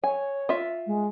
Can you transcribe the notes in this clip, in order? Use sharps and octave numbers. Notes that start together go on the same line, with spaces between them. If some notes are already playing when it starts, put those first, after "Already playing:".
C#5 G#5
F4 E5
G#3